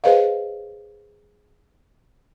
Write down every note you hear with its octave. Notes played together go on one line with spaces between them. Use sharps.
G#4 B4 C5 D#5 F5